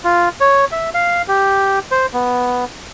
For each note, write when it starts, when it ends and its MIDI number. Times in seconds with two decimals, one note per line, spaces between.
0.04 0.29 65
0.40 0.65 73
0.72 0.90 76
0.94 1.22 77
1.28 1.79 67
1.91 2.06 72
2.13 2.65 59